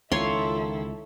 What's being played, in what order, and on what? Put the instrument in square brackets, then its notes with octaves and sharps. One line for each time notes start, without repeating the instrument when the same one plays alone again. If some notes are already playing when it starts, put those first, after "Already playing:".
[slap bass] C#2 [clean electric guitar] D#3 F4 [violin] E4 A4 [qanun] C#5 C6